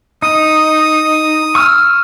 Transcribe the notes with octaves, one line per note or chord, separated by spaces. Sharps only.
D#4 D#6
C#6 E6 F6